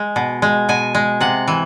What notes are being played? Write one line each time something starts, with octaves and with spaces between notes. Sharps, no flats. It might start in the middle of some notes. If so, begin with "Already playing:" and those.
Already playing: G#3
B2
G#3
B2 G#5
G#3
C3 F#5
E3